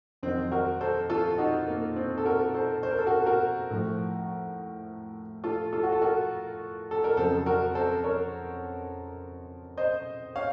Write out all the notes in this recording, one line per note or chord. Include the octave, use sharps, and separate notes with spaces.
F2 D#3 F#3 C4
F#4 A#4
A4 C5
F4 A4
D#4 F#4
A#3
C4
A4
F#4 A#4
A4 C5
C5
A#4
A4
F#4 A#4
F#4 A#4
A2 F3
F4 A4
F4 A4
F#4
A4
F#4 A#4
A4
A#4
F2 C#3 F#3 A4 C5
A4
F#4 A#4
A4 C5
A#4 C#5
C5 D#5
C#5 F5